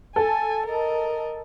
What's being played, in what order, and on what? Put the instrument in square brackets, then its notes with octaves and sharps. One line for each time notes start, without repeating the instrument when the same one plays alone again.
[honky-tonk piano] A4 [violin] G#5
[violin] A#4 D#5